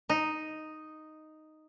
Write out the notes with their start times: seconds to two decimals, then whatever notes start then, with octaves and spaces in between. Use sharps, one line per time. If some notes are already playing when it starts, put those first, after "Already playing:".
0.09 D#4